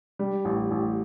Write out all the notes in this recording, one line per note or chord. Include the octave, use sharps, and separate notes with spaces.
G3
A1
A1